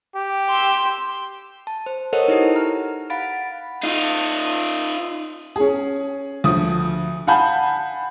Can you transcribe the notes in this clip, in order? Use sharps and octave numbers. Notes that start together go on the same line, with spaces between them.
G4
C6 E6
A5
C5
A4 A#4 C5 C#5 D#5 F#5
D#4 E4 G4
A#5 F6
F5 F#5 B5 A6 D7
D#4 F4
C#4 G#4
D2 F3 D#6
F5 F#5 G#5 A5 B5 G6